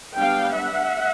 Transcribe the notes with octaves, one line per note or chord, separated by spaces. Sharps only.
G3 B3 D4 F5 G5
E5 F#5